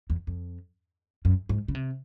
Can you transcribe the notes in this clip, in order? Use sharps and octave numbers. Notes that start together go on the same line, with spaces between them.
E2
F2
F#2
G#2
C#3
C3